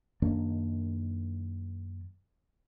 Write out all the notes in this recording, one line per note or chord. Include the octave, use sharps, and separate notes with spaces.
F#2 D#3 A#3 D4